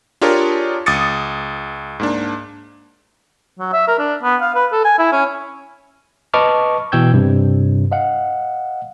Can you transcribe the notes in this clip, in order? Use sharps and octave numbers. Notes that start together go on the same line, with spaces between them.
D4 F4 G4 G#4 A#4 C#5
C#2 D6 D#6 A6 C#7
G#2 A#3 D4
F#3
E5
A#4
D4
B3
F5
B4
A4
G#5
E4
C#4
B4 D#5 A5 C#6 D6 F6
B2 E3 G5 E6 G6 G#6
G2 C3
D#5 F5 F#5